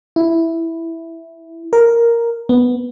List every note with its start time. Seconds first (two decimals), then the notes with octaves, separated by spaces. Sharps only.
0.16 E4
1.73 A#4
2.49 B3